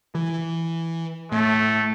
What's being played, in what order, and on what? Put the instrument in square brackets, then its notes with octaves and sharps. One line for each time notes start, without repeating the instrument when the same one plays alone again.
[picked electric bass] E3
[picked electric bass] A2 [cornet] A3